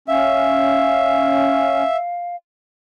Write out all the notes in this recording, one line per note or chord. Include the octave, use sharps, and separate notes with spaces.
C#4 E5 F5